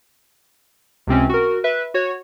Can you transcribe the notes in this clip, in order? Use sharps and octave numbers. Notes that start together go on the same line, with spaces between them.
C#2 C3 C4 C#4
F#4 A#4
B4 E5
F#4 C#5